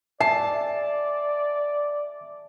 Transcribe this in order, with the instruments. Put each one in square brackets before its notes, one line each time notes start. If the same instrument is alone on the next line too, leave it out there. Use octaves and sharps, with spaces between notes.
[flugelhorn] D5 [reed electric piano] E5 [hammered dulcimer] A5 [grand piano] C7